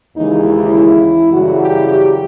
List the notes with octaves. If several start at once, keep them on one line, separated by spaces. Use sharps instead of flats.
D#2 C#3 E3 G#3 D#4
E4
F#2 C#3 E3 G3 F#4
G4
G4